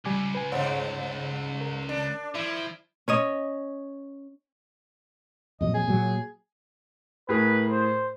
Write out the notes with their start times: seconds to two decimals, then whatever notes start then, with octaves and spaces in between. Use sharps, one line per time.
0.05 C#2 G3 G#5 D6
0.35 B4 G#5
0.52 G2 C#3 C5 C#5
1.61 A#4
1.89 D4
2.35 F3 E4
3.08 C#4 C#5 D#5
5.61 F2 A#2 F#3 D#5
5.74 G#4
5.88 A#2 F#3
7.29 A2 G#4 A#4 B4
7.71 C5